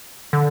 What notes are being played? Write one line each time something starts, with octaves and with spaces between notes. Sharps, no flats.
D3